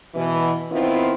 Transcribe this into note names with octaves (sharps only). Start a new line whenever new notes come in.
B2 E3
D#3 B3 C4 E4 F4